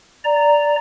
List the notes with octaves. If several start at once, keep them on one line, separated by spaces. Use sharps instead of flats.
D5 A#5